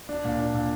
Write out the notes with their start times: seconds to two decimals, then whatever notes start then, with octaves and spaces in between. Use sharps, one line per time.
0.09 D4
0.25 A#2
0.39 D4
0.54 A#2